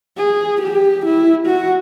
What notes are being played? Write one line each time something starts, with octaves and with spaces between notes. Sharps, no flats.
G#4
G4
E4
F#4